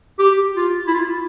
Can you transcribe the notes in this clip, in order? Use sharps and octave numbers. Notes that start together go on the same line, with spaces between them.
G4
F4
E4
F4